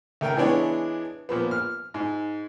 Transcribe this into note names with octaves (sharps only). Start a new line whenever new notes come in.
C#2 A3 A#4 G5
E3 G#3 B3 D4 C#5
A#2 F3 B3
F6
G#2